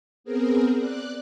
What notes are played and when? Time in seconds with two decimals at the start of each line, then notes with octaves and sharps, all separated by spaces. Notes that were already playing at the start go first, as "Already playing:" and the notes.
0.24 B3 C4 G#4 A#4
0.77 D5 F#6